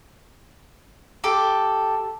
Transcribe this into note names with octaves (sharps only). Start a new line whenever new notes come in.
G4 A4